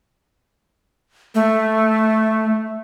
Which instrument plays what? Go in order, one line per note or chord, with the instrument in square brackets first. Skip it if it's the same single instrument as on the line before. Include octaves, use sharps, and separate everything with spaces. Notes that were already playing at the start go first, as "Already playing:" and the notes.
[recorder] A3